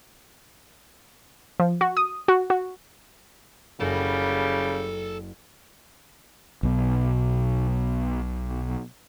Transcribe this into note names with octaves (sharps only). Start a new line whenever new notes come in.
F3
F#4
D#6
F#4
F#4
F#1 C#3 G3 A4 G#5 A#6
B1 B2